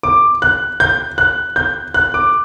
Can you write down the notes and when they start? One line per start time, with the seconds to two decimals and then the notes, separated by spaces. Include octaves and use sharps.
0.03 D6
0.42 F#6
0.80 G6
1.18 F#6
1.56 G6
1.94 F#6
2.14 D6